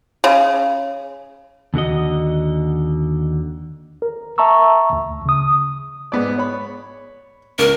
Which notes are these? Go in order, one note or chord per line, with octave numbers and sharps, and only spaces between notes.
C#3
D#2 D3 F#4 D#5
A#4
E5 A5 A#5 C#6 E6
D2
C#3 D#6
G#2 B3 D5
C#5 B5
C#2 A#4